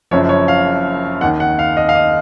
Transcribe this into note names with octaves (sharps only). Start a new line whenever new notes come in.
F#1 F#2 F3 C#5
C#5
F5
D#2 D#3 F#5
F#5
F5
D#5
F5
D#5